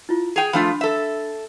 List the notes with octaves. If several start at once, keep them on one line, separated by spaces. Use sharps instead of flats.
E4 F4
G#4 G5 D#7 F7
F3 A3 D4 F4 B5
A4 E5